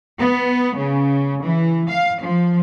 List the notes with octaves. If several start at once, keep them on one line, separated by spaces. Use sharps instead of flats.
B3
C#3
E3
F5
F3